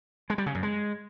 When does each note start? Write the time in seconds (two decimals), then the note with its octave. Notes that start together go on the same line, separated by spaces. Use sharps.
0.30 G#3
0.38 G3
0.46 C#3
0.55 F#2
0.63 G#3